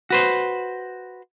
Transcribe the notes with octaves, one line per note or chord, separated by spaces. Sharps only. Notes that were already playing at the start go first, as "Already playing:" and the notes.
F#4 B4 C5